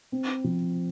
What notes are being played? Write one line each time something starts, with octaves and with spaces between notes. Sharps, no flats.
C4
F3